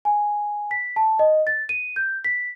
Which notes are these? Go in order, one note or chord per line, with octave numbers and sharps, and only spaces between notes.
G#5
B6
A5
D#5
A6
D#7
G6
B6